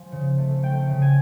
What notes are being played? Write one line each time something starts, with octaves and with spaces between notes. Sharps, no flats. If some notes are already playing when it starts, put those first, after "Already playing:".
Already playing: F3 G#5
C#3
A3
A3 G5
C#3
G#5